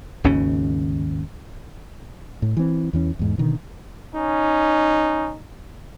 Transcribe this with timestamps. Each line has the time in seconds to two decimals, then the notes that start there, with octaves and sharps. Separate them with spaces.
0.24 G#1 D#2 C#3 C#4
2.42 A2
2.57 E3 C4
2.93 E2 E3 C#4
3.19 E2 G#2
3.38 B2 D3 D#3
4.15 C#4 D#4